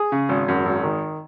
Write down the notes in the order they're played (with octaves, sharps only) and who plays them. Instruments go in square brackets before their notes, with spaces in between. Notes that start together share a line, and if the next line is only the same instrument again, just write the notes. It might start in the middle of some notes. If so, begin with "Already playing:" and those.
Already playing: [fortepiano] G#4
C#3
G#1
F#2
G#1
D#3